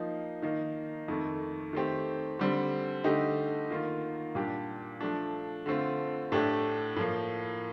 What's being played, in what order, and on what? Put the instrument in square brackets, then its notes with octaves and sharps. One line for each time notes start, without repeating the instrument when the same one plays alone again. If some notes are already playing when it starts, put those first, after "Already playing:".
Already playing: [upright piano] F3 A#3 D#4
D#3 A#3 D#4
F2 D#3 A3
D#3 A3 C4 G4
D3 G3 C4
D3 A3 D#4 G4
D#3 A#3 F4
A#2 G3 D4 G4
F3 A3 D4
D3 A3 C4 F4
A2 A3 D4 G4
A2 F3 A#3